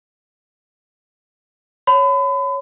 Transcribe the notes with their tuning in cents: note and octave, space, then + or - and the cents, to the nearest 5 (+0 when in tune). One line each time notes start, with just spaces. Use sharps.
C#5 +0 B5 +35